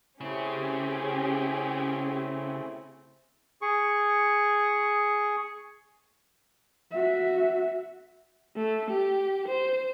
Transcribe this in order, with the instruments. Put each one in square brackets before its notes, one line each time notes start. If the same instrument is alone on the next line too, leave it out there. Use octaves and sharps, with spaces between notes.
[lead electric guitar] C#3 [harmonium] A3 C4 E4 [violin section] C#4 G4 G#4
[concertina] G#4 C#6
[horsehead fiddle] F#4 E5
[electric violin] A3
G4
C5